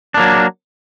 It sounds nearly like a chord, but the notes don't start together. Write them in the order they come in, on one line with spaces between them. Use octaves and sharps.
D4 A#3 F#3